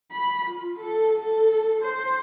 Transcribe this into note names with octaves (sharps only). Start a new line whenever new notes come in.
B5
F4
A4
A4
C5